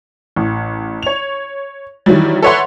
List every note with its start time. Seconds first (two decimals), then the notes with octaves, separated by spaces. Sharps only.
0.36 A1
1.03 C#5 F7
2.06 D#3 E3 F#3 G3
2.42 A4 B4 C#5 E5 F#5 C6